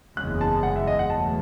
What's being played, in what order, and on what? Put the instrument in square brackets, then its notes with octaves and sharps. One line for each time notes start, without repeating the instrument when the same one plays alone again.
[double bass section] F#1 E2 C#3 G#3 [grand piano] F#6
[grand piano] A5
F#5
E5
D#5
F#5
[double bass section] E2 B2 F#3 A3 [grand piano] A5